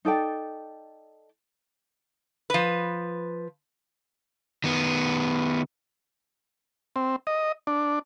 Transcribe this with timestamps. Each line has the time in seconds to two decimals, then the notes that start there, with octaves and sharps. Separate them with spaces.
0.05 D#4 A4 D5 G5
2.50 F3 B4
4.64 D#3 B3
6.96 C4
7.27 D#5
7.67 D4